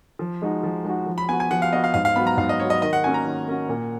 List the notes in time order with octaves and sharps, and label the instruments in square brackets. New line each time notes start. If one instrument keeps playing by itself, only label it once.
[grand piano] F3
G#3 D#4 F#4
F3
G#3 D#4 F#4
F3
[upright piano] B5
[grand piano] B3 F#4 [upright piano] G#5
[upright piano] G#5
[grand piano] F3 [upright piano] F#5
[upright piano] F5
[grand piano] B3 F#4 [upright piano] D#5
[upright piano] F5
[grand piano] G#2 [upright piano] F5
[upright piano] F5
[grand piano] F#3 B3 [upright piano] B5
[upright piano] A#5
[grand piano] G#2 [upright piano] F5
[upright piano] D#5
[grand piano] F#3 B3 [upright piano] C#5
[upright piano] D#5
[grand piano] D#3 [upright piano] D#5
[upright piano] F#5
[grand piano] A#3 C#4 F#4 [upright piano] G#5
[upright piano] A#5
[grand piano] D#3
A#3 C#4 F#4
A#2